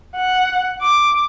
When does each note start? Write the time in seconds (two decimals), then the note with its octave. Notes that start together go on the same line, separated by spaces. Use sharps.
0.16 F#5
0.81 D6